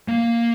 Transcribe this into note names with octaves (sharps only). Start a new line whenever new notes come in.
A#3